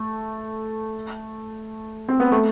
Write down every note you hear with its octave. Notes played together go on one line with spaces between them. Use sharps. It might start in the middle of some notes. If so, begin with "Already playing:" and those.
Already playing: A3
C4
B3
A3